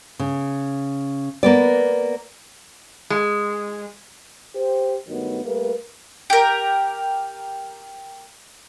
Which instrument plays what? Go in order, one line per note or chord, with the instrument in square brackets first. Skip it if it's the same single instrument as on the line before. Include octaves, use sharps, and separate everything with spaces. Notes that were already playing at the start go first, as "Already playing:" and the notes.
[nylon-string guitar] C#3
A#3 B3 D5
[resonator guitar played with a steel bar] G#3
[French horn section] G4 C5
G2 D#3 F#3 A3 B3
G3 A3 A#3 A#4 B4
[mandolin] G4 A#4